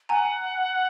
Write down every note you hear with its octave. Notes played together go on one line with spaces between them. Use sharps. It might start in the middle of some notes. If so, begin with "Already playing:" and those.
F#5 G#5 A#5